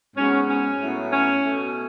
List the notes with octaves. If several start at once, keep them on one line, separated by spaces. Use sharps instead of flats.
G#2 F#3 B3 C#4
C#4
A2 F#3 B3
C#4
B2 A3